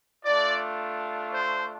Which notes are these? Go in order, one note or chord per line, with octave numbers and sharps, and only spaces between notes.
A3 D4 F4 D5
C5